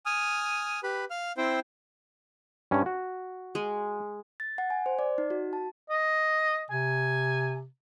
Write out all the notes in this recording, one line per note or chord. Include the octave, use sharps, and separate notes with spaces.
G#5 D#6 F6
G4 B4 B5
F5 F6
C4 E4 C5 G5
G2 C#4
F#4
G#3
A6
F#5
G#5
C5
D5
D#4
F#4
A5
D#5
C3 G#5